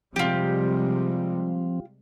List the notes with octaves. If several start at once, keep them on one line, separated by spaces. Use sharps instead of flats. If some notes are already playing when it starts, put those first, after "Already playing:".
C3 F3 G3 G#3 C4 F4 G4